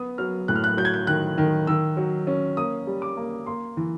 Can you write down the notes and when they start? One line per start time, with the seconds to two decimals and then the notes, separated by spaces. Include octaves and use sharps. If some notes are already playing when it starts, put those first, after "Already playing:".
Already playing: B3 D#6
0.18 F#3 F6
0.48 A2 F#6
0.56 F6
0.64 F#6
0.77 F#3 G6
0.85 G#6
0.94 G6
1.07 D#3 F#6
1.38 D#3
1.67 D#3 E6
1.97 F#3
2.27 C#4
2.57 A#3 D#6
2.87 G3
3.02 D6
3.17 A#3
3.46 A#3 C6
3.77 E3